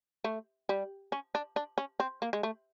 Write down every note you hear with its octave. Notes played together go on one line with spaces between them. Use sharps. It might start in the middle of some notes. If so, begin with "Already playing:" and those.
A3
G3
C#4
D4
D4
C#4
C4
A#3
G#3
A3